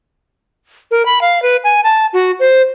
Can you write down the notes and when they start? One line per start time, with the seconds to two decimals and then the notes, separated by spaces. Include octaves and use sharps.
0.91 A#4
1.06 B5
1.21 F5
1.42 B4
1.64 G#5
1.84 A5
2.13 F#4
2.40 C5